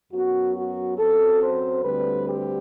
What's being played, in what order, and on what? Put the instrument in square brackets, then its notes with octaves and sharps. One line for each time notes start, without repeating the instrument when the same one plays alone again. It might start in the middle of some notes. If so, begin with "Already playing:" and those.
[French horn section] F#2 F#3 B3 F#4
F#4
F#2 F#3 C4 A4
C5
D2 D3 G3 C4 B4
G4